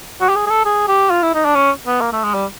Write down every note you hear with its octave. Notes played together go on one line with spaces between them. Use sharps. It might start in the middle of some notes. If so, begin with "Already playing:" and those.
F#4
G4
G#4
G#4
A4
G#4
G4
F4
E4
D#4
D4
C#4
B3
A#3
A3
G#3
G3